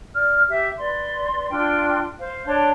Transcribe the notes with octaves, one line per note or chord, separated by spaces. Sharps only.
D5 F6
G4 E5
B4 D5 C6
D4 F4 G5 C6
C5 F5
D4 C#5 A5 C6